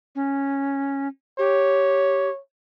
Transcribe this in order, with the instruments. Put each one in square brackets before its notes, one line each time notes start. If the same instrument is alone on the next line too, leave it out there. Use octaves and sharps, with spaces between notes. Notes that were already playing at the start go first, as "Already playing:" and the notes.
[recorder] C#4
[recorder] G4 [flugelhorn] C#5